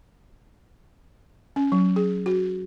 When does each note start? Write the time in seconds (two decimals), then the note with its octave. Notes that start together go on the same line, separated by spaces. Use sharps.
1.56 C#4
1.72 F#3
1.96 G#4
2.26 F#4